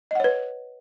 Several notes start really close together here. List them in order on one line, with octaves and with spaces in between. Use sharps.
D#5 F#5 C#5 B4